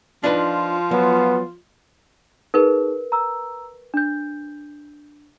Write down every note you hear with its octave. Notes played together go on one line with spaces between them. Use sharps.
F3 D4 D#4 F4 B4
F#3 B3
D#4 G#4 A#4 B4
A#5 E6
D4 G6